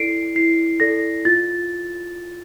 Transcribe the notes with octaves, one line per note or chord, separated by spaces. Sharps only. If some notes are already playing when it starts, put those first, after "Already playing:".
Already playing: E4 A4 D5 C7 D7
E4 C7
A4 D5 A#6
F4 A6